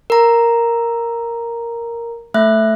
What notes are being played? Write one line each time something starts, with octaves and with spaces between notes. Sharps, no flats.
A#4 A#5
A3 E5 F#6